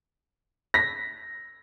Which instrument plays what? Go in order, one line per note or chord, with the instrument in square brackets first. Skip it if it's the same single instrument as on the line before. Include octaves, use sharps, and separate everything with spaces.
[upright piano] A#6 B6